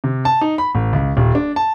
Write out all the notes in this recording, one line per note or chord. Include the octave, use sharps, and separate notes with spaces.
C3
A5
D#4
B5
A1
C#2
D#1
D4
A5